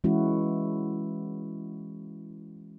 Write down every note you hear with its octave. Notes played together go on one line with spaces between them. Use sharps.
E3 G#3 C#4 E4 F#4